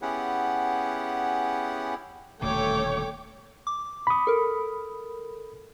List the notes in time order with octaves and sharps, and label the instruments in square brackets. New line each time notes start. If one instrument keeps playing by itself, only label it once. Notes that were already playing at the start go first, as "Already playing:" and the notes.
[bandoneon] B3 C#4 E4 G4 G#4 F#5
[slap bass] D#1 B2 D3 [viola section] A3 C#5 [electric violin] G5 D6
[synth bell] D6
[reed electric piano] B5 D#6
[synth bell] A4 A#4